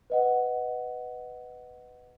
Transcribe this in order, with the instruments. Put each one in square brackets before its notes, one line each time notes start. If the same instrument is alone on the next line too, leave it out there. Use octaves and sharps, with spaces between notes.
[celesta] B4 D#5 F#5